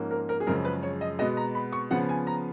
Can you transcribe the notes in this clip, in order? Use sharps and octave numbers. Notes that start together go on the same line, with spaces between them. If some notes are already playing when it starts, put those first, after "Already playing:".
Already playing: G#2 F3 A#3 C#4
A#4
A#4
G#4
F#2 C#3 F3 G#3 A#4
B4
C#5
D#5
B2 G#3 B3 D#5
A#5
B5
C#6
C#3 F3 B3 F#5
G#5
A#5